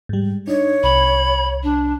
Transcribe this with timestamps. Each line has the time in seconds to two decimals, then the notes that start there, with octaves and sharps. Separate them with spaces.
0.09 G#2 G3
0.48 D4 D#4 C#5
0.83 C2 B5
1.63 D4